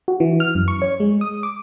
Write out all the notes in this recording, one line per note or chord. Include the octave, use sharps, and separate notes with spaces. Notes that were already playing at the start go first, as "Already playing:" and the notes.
F#4
E3
F6
F#2
C#6
C#5
G#3
D#6
D6